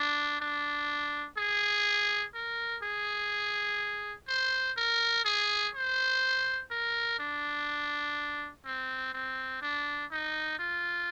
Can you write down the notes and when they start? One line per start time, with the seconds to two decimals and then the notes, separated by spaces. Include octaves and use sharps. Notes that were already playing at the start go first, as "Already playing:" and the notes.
Already playing: D4
0.40 D4
1.38 G#4
2.34 A#4
2.83 G#4
4.28 C5
4.77 A#4
5.25 G#4
5.75 C5
6.71 A#4
7.19 D4
8.65 C4
9.14 C4
9.62 D4
10.11 D#4
10.59 F4